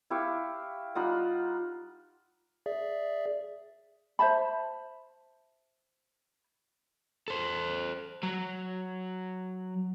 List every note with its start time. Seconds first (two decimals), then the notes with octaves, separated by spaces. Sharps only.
0.10 E4 G4 F5 C#6
0.95 G3 D#4 F4 F#5
2.66 G#4 D5 E5
4.19 C5 E5 A5 B5
7.28 A4 C5
8.23 F#3